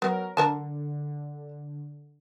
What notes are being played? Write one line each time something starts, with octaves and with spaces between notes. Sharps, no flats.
F#3 B3 A#4
D3 D4 A#4 A5